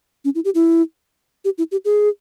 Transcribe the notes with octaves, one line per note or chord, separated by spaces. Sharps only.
C#4
E4
G4
E4
G4
E4
G4
G#4